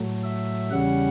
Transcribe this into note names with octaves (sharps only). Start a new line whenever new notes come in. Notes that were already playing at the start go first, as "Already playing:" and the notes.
Already playing: A2 F#3 A3
E5
E2 C#3 G3 C#4 F#5